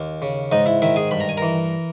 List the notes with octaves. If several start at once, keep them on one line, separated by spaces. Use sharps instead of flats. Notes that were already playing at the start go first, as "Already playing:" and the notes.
Already playing: D#2
C#3
G#2 D#4 D#5
E4 E5
D#3 E4 E5
G#4 G#5
G2 B5
A#5
G#5
E3 A#4 A#5